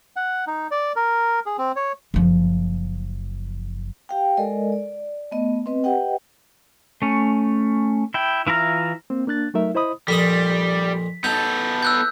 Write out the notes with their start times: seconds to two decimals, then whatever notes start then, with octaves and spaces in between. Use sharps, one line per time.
0.16 F#5
0.47 D#4
0.71 D5
0.96 A#4
1.46 G#4
1.58 C4
1.76 C#5
2.14 F#1 F3
4.09 G4 F5 G5
4.37 G#3 A4 A#4 D5 D#5
4.72 D5
5.31 A3 B3 D#5
5.66 C4 B4 D#5
5.84 G4 B4 D#5 F#5 G5
7.02 A3 C#4
8.14 E4 G5
8.47 E3 E4 F4 A#5 F6
9.10 A#3 C4
9.27 A#3 D4 F#6 A6
9.54 F#3 A3 D#4 A#4 E5
9.75 E4 C5 D#5 B5 D#6
10.08 F2 A#2 G3 D#6 B6
11.24 B3 D#4 A4 G6
11.83 E6 F#6 G6